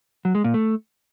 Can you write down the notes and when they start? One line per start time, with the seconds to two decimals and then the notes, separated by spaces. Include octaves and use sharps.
0.25 F#3
0.35 G#3
0.44 A#2
0.54 A3